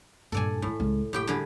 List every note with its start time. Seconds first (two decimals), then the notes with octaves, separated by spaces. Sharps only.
0.32 G2 A#2 A4 D5 G#5
0.62 A2 D4 E4
0.80 C#2
1.13 F#1 A2 G4 G5
1.27 D3 G3 G#4